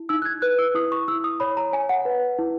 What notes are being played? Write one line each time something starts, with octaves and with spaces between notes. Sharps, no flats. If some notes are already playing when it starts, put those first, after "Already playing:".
Already playing: E4
D#4 E6
F#6
G#6
B4 F#6
E6
E4 D#6
C#6
E4 E6
D#6
C#5 B5
A#5
C#5 G#5
F#5
B4
E4